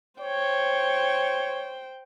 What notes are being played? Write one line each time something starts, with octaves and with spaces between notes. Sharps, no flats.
C5 C#5 G5